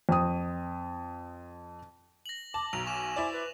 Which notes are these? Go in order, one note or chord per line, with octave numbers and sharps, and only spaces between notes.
F2 D#6
A#6 F#7
A5 D6
B1 A#5 F7
G#5 C#6 D6 E7
E4 C5 D5
B4